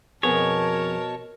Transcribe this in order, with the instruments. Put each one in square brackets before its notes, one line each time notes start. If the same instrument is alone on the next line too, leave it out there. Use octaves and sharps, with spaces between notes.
[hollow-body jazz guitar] F2 B3 G#4 [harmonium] B2 A5 [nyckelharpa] A#4 [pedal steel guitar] C#5